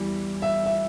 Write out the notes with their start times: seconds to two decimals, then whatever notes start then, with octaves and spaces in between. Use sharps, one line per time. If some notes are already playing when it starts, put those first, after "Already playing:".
Already playing: E2 E3 G3
0.42 E5
0.66 E5